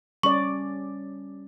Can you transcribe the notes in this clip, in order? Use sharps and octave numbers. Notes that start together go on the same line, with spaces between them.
G3 C#4 D5 C#6